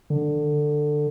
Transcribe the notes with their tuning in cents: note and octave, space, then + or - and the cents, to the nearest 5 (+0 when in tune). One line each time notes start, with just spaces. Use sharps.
D3 +15